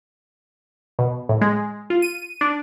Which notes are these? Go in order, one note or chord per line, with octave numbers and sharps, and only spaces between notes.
B2
A2
G#3
F4
D#7
D4